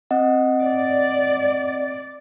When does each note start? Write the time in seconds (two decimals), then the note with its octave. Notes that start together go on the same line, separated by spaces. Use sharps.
0.11 C4 D#5 F#5
0.61 D5